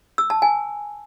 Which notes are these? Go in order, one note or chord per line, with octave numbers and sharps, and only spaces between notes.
E6
A5
G#5